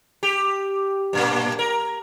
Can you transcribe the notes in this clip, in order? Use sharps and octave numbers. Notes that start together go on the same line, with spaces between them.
G4
G2 A#2 A#3
A#4